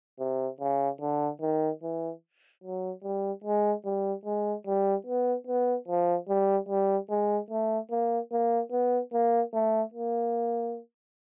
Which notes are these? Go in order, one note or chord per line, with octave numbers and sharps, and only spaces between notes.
C3
C#3
D3
D#3
E3
F#3
G3
G#3
G3
G#3
G3
B3
B3
F3
G3
G3
G#3
A3
A#3
A#3
B3
A#3
A3
A#3